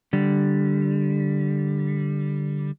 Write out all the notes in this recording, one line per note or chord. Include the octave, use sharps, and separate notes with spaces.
D3 G3